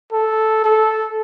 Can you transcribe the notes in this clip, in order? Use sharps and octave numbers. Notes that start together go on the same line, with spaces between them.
A4
A4